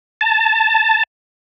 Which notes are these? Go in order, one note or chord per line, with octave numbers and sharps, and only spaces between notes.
A5